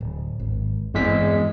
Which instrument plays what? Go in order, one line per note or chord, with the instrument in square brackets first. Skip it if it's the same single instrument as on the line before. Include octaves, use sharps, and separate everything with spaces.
[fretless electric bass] D1
G#1
[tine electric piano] E2 G#3 B6 [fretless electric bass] G2 C4